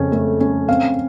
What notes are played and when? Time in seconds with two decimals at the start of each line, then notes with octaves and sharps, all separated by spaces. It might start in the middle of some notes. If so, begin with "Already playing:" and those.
Already playing: F2 C#3 C#4
0.12 A3
0.40 C#4
0.68 C4 F5